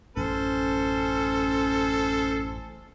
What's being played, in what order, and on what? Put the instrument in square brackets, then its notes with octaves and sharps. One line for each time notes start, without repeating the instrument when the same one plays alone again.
[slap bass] A1 F#2 [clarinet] C#4 [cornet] A4 [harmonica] C5